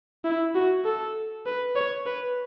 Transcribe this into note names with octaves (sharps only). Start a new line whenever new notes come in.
E4
F#4
A4
B4
C#5
B4